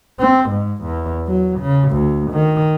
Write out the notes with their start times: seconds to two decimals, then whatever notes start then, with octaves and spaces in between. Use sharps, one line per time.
0.20 C4
0.50 G#2
0.84 E2
1.28 F#3
1.60 C#3
1.92 D2
2.32 D#3